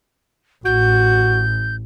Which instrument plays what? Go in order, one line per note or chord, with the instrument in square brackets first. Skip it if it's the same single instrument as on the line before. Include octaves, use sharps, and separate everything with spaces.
[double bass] A1 [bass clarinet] F#4 [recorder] G6